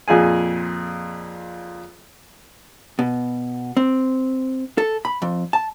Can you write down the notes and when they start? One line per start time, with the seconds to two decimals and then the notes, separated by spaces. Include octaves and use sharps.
0.08 F2 A#2 G#4 G#5
2.99 B2
3.77 C4
4.78 A4
5.05 B5
5.22 F2
5.53 A5